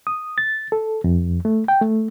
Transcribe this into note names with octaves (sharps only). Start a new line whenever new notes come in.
D#6
A6
A4
F2
A3
G5
A3